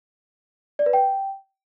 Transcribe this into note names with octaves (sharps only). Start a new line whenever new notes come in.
D5
B4
G5